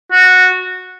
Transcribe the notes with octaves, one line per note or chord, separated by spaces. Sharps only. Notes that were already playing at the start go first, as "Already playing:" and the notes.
F#4